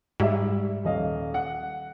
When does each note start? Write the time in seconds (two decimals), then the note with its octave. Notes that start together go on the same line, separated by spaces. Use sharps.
0.20 G#2 G3 E5
0.85 D#1 D#5 F5
1.34 F#5